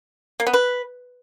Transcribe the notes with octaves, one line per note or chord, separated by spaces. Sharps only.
A#3
B3
B4